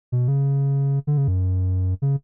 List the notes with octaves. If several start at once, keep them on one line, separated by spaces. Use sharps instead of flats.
B2
C#3
D3
C#3
F#2
C#3